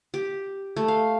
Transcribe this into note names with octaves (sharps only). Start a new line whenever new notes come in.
G4
A3
F5